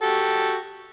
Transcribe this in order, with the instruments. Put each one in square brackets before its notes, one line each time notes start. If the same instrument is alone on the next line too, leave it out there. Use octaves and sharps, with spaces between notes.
[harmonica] F#4 G4 A4